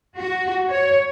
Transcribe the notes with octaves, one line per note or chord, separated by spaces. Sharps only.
F#4
C#5